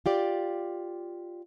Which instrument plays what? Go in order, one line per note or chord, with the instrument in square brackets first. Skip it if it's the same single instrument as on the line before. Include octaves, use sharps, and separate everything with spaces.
[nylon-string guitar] F4 G4 D5